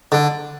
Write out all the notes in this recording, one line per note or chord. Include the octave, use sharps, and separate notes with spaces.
D3